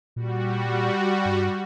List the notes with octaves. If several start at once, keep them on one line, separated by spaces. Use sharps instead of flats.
A#2 G3 F#4
G2